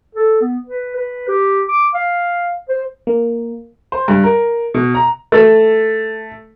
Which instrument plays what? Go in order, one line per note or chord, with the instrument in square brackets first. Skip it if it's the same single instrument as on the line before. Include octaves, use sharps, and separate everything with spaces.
[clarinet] A4
B3
B4
B4
G4
D6
F5
C5
[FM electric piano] A#3
[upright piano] C5
G2
A#4
B2
A#5
[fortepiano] A3